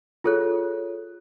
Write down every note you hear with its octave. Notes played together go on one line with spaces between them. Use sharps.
F4 G#4 A4 C#5 F#6